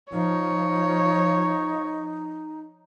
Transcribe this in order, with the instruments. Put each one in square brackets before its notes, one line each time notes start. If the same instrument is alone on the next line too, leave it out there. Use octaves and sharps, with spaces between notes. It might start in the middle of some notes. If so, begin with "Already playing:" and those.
[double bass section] F3 [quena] D#4 [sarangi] C#5